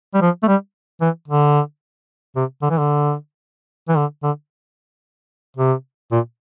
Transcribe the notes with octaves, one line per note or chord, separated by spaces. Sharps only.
G3
F3
A3
G3
E3
D3
C3
D3
E3
D3
E3
D3
D3
C3
A#2